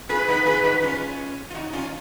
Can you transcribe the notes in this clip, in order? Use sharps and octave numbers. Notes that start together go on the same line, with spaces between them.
F4 G#4 B4
B3 D#4
F4 G#4
D#4 F#4
C#4 F4
F4
D#4 F#4
C#4 F4